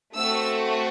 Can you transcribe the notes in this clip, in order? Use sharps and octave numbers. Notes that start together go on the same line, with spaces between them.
A3 C4 F#4 E6